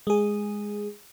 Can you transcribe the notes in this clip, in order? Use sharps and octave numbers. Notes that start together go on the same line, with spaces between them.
G#3 G#4